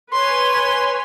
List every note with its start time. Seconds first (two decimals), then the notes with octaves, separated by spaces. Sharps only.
0.12 B4 C#5 G#5 C6